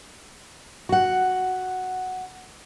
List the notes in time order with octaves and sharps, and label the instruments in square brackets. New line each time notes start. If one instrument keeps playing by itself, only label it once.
[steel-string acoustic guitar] F#4 F#5